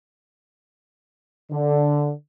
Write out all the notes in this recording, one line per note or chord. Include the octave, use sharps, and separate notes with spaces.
D3